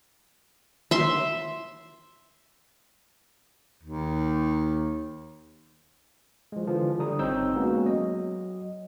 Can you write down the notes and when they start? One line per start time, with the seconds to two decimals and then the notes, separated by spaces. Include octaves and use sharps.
0.91 E5 C6
3.83 D#2
6.52 F3 G#3
6.67 D3 E3 F3
6.99 D3 G3 A#5 D#6
7.19 A1 C4 D#4 C#5 E6 G6
7.56 G#3 A#3 B3 C#4 F#4
7.86 F#3 D#5